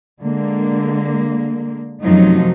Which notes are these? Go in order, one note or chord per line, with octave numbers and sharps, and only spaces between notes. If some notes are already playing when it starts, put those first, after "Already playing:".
D3 G#3 A#3
F#2 C3 F3 F#3 A3 D#4